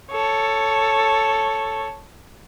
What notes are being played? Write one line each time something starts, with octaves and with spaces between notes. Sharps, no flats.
A4 C#5